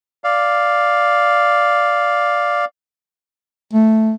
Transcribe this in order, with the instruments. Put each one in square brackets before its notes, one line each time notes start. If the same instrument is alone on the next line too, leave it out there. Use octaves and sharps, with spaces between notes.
[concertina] D5 F5
[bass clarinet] A3